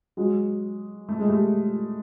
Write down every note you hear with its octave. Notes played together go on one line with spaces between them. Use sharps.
F#3 G#3
A3
G#3
G3 A3